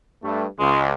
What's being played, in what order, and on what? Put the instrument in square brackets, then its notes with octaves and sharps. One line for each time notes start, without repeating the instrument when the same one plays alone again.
[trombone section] G2 A3
[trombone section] C#2 [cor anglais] G#3